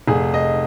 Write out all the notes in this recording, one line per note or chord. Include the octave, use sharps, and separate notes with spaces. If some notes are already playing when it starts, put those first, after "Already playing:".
F1 G#4
D#5